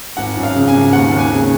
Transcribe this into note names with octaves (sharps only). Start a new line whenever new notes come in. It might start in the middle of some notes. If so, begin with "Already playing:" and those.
G#1 F#5
F#2
F5
C#3
G#5
G#1
D#2 F#5
D#2
G#5
C#3